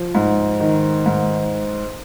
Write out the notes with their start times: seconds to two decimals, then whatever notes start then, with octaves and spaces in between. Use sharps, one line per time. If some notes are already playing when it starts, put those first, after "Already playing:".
Already playing: F3
0.15 G#2
0.60 D#3
1.06 G#2